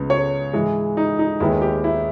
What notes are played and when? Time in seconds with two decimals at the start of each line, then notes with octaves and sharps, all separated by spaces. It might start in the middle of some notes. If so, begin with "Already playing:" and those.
Already playing: C#2 C#3 G#3 B3
0.10 C#5
0.53 G#2 E3 G#3
0.97 D#4
1.19 D#4
1.40 D#2 D#3 G#3 B3 E4
1.61 G4
1.84 E4